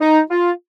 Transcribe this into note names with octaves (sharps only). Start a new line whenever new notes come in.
D#4
F4